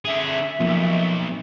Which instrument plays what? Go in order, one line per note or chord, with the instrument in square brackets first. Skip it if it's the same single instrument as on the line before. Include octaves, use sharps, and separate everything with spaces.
[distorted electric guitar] D3 G#4 [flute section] E5
[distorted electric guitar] B1 F2 [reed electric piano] F3 A#3